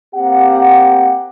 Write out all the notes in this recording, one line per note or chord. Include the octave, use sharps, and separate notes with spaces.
A#3 C4 G4 F#5